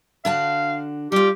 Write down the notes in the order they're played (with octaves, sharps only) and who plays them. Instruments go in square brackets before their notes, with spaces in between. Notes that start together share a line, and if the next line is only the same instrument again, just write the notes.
[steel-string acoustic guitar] D3 F#4 A5 [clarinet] F5
[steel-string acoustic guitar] G3 F4 [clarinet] G4